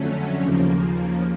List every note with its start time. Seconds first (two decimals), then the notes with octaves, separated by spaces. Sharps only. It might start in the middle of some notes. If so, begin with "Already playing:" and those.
Already playing: F2 D3 F#3 A3 C#4
0.39 D#2 C#3 F3 A#3